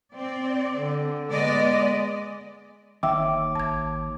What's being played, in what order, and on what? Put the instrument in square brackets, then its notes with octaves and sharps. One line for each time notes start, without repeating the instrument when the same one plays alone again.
[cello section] C4 D5
[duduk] D3
[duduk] G#3 [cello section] B3 D5 D#5
[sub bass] F#1 [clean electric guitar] D#2 [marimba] E5 G5 E6 [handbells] D6
[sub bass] A1 [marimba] A5 G#6